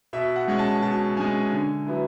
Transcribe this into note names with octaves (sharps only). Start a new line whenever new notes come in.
B2 E5
F#5
G#3 C#4
A5
B2 A5
G#3 C#4 G#5
D3
F#3 B3 E4